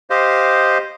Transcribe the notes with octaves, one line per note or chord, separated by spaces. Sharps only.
G4 C5 D#5 F5